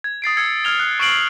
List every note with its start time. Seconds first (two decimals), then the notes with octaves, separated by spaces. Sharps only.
0.04 G#6
0.22 D#6 A6 C7 D7
0.37 D#6 E6 G#6 C#7
0.64 F6 G#6 A6 F7 G7
0.80 F#6
1.00 C#6 F#6 C7 D7 F#7